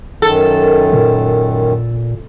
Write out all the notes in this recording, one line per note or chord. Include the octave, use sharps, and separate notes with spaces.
F#2 D#3 A4
A#2